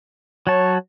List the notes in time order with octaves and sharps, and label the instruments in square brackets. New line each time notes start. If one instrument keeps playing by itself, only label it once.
[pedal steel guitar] F#3 A5 [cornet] C#5